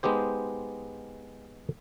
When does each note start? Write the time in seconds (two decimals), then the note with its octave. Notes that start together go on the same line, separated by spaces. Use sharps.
0.03 G#3 B3 D#4 G4 C5